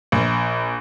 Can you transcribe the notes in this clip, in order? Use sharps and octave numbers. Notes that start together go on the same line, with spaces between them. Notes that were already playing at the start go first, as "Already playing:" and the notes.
A#1